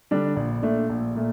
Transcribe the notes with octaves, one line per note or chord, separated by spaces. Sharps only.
D3 G3 D4
A#1
A#2 A3 D4
A#1
A#2 A3